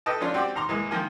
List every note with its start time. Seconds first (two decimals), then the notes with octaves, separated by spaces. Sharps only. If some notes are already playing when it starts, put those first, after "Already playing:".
0.06 A4 B4 D#5 G5 A5
0.21 F3 C#4 D4 F4
0.34 C4 F#4 G4 D5
0.55 D#2 A#5 C6 D6
0.69 C2 E3 G#3 A#3
0.91 D#3 F3 A#3 G#5